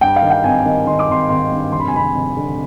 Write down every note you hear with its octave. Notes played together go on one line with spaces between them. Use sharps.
G2 G5
F5
D#3
G5
G#1 G#5
D#3
D#3 C6
D6
G#1 C6
G#1 C6
G2
F1 C6
B5
G#5
F1 B5
F1
D3